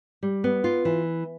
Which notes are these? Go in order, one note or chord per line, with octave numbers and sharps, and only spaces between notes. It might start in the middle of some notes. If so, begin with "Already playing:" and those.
G3
B3
F4
E3